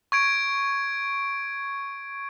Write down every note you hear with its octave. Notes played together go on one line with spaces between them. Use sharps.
C#6 G#6 D7